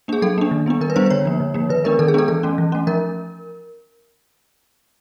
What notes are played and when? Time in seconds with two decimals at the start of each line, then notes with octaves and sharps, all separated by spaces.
0.08 A#3 D4 G#4
0.22 F#3 A4
0.38 A#3 D4
0.51 D#3
0.66 G3 B3 D4
0.81 D#3 A#4
0.90 B4
0.96 G3 B3 D4 C5
1.06 C5
1.10 D3 C#5
1.25 F3 A#3
1.40 D3
1.54 F3 A#3
1.69 D#3 B4
1.84 G#3 B3 D4 A#4
1.99 D#3 A4
2.08 G#4
2.14 G#3 B3 D4 A4
2.28 E3 A4
2.43 A3 C#4
2.58 E3
2.72 A3 C#4
2.87 F3 A#4